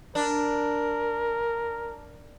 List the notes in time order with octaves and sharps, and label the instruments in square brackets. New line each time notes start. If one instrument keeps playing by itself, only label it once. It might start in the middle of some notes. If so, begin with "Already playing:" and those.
[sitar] D4 [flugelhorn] A#4